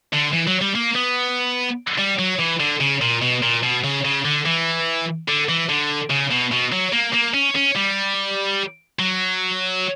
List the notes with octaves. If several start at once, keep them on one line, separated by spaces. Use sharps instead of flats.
D3
E3
F#3
G3
A#3
B3
G3
F#3
E3
D3
C#3
A#2
B2
A#2
B2
C#3
C#3
D3
E3
D3
E3
D3
C#3
B2
B2
F#3
A#3
A#3
C#4
C#4
G3
F#3